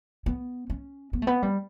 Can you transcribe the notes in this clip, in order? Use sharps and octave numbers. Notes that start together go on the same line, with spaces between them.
B3
C#4
B3
A3
B3
G3